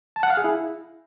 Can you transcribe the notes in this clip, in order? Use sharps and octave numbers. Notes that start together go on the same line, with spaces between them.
A5
F#5
F5
G#4
E4